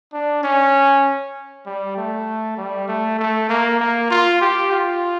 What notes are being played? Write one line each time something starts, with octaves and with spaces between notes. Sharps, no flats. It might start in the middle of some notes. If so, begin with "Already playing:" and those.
D4
C#4
G3
A3
G3
A3
A3
A#3
A#3
F4
G4
F4